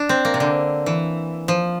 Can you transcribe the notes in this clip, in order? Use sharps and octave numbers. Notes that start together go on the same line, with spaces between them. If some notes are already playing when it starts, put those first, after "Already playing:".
Already playing: D4
C4
A#3
C3
D3
E3
F3